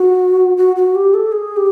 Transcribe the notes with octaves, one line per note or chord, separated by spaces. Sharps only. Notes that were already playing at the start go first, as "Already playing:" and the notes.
Already playing: F#4
F#4
F#4
G4
A4
G#4
G4